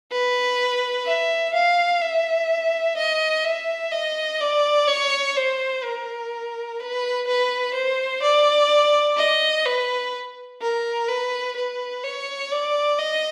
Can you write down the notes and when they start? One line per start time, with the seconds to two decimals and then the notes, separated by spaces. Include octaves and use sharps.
0.12 B4
1.06 E5
1.54 F5
2.02 E5
2.97 D#5
3.45 E5
3.92 D#5
4.41 D5
4.88 C#5
5.36 C5
5.83 A#4
6.80 B4
7.27 B4
7.74 C5
8.22 D5
9.17 D#5
9.66 B4
10.62 A#4
11.09 B4
11.56 B4
12.04 C#5
12.52 D5
12.99 D#5